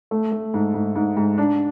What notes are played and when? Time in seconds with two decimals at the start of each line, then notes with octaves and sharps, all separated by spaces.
0.11 A3
0.32 A3
0.54 G#2
0.74 G#2
0.96 G#2
1.17 G#2
1.38 D4